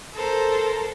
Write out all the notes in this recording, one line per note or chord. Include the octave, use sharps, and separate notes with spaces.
A4 A#4 C5